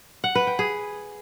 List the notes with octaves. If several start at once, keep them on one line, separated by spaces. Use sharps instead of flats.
F#5
B4
G5
G#4